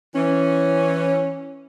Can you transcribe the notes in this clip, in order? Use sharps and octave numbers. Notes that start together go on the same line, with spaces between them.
E3 C#4